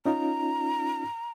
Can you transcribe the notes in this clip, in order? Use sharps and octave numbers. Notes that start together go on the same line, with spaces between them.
C#4 D#4 F4 A#5